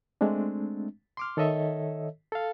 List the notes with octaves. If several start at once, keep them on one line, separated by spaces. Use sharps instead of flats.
G#3 A3 C4 D4
C6 D6 F6
D#3 A4 C#5 D#5 E5
A4 F5